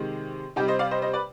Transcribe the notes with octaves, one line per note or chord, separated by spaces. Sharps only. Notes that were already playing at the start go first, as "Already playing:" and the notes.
Already playing: C3 D#3 G#3
C3 G3 D#4 G4
C5 D#5
D5 F5
C5 D#5
C5 D#5
B4 D5